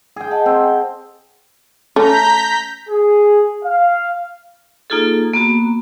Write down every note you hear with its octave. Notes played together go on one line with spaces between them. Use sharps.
G#4 G5
D#5 F#5 A5
C4
A3 C#4 A#5 G6 B6
G#4
F5
A#3 D#4 F4 G#4 A4
A#3 B3 F#4